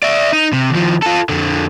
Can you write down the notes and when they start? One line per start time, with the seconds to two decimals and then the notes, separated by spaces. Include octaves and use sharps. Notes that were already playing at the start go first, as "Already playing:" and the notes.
0.03 D5 E5
0.33 D#4
0.53 C3
0.71 D#2 F3
1.03 F4 A4
1.29 F2 D3